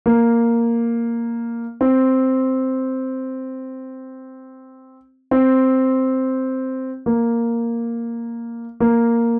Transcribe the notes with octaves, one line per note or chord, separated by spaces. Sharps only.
A#3
C4
C4
A#3
A#3